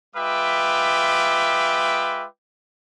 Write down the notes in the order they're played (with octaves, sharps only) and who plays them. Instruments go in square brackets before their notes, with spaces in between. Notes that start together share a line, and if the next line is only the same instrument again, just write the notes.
[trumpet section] G#3 F4 B4 E5 G5 D6